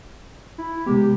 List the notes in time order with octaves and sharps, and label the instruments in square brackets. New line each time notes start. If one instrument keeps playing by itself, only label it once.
[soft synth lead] E4
[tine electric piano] C3 G#3 B3 [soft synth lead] G4